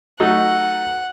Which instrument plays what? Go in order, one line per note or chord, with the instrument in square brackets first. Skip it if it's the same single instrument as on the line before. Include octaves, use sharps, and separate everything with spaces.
[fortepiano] F#3 A3 D#4 [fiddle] F#5